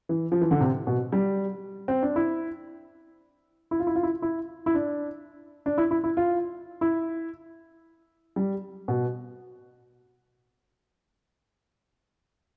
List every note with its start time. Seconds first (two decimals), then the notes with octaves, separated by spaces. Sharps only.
0.09 E3
0.32 F3
0.41 E3
0.51 D3
0.61 C3
0.87 B2
1.12 G3
1.88 C4
2.03 D4
2.16 E4
3.71 E4
3.80 F4
3.87 E4
3.95 F4
4.03 E4
4.22 E4
4.66 E4
4.75 D4
5.66 D4
5.78 E4
5.91 E4
6.04 E4
6.17 F4
6.81 E4
8.36 G3
8.88 B2